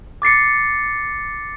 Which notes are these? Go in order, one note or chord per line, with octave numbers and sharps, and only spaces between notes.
D6 A6 C7 C#7